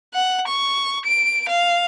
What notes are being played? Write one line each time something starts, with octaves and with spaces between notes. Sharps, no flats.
F#5
C#6
D7
F5